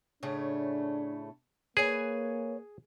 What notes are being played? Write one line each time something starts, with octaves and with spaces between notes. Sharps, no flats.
A2 C#3 A3 D4
A#3 G#4 B4 C#5 G#5